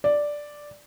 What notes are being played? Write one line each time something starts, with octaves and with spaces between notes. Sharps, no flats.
D5